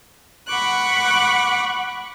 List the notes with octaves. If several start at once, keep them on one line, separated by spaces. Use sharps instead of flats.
F#5 B5 C#6 D6 F#6